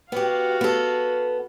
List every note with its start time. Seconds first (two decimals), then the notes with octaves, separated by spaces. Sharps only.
0.12 B3 F#4 G4 F5
0.61 B3 A4